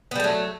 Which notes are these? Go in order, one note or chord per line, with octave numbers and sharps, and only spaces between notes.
F#3 G3 A3 B3